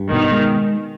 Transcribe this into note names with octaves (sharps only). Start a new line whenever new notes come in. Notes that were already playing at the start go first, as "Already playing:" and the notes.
Already playing: G2
B2 D#3
G#3